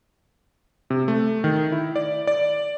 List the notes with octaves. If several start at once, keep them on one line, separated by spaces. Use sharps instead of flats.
C3
A3
D#3
E4
D5
D5